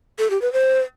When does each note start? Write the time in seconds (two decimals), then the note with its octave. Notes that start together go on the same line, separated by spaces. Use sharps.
0.19 A4
0.30 G4
0.42 B4
0.53 C5